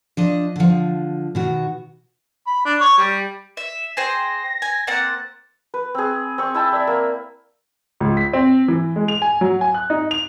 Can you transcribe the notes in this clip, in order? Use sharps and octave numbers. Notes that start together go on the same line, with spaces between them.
F3 D4 D#5
D3 F3
B2 D#3 F#4
B5
D4
C#5
G3
E5 E7
G#4 C5 G5 A#6
G#5
A#3 C4 F#5 A6
B4
C4 G#4
C4 C#6
E4 G5 A5
D5 E5
A#3
C#2
B6
C4
E3
G#3
F7
G#5
F#3
G#5
F#6
D#4
F7